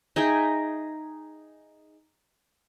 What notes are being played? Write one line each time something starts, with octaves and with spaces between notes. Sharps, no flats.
D#4 G#4 E5 G5